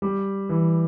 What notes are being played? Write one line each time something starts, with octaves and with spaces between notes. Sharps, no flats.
G3
E3